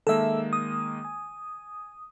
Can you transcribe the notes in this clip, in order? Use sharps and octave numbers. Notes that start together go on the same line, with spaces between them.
D#3 G#3 A#3 A4 E5
D#6
G#5